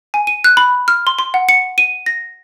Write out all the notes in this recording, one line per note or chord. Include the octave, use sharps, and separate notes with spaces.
G#5
D#7
F#6
B5
F6
C6
C6
F#5
C#7
D#7
A#6